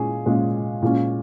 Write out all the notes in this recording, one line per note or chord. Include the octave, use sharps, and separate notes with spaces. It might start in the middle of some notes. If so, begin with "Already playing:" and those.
Already playing: A#2 G#3 C#4 G#4
A#2 G#3 C#4
A#2 G#3 C#4